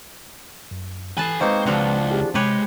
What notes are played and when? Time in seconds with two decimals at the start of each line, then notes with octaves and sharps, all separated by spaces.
0.71 F#2
1.18 E3 A4 B4 G#5 A5
1.41 G#3 A#3 C4 D#4 B4 C5 F5 C#6
1.66 C#2 F3 D4 F4 F#4
2.11 E4 G4 G#4
2.35 C3 G#3 G4 B4 C#5